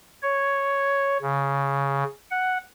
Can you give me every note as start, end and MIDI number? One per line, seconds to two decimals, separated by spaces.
0.23 1.18 73
1.22 2.03 49
2.30 2.58 78